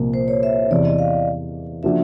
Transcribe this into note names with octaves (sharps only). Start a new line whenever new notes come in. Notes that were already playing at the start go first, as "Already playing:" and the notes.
Already playing: C2 A#2 F3 A#3
C5
C#5
E5
E2 C3 E3 D5
D#5
F5
C#3 F3 A#3 D4 F#4 E5